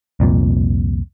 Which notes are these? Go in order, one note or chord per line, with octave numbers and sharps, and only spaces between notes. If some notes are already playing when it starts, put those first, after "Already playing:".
C2 F2 A#2